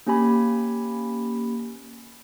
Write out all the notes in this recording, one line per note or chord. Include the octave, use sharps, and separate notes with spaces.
A#3 C#4 G4 G#5 B5